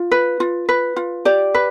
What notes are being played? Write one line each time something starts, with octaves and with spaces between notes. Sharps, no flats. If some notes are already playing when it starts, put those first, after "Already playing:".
Already playing: F4
B4
F4
B4
F4
G4 D5
B4